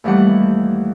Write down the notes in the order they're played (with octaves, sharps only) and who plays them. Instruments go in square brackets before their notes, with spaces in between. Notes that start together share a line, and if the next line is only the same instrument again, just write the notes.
[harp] D#2 E3 G3 A3 F#5